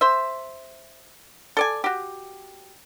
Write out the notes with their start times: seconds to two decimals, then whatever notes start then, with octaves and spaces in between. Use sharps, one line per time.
0.01 C5 E5
1.57 A4 D5 G#5
1.84 F#4 G4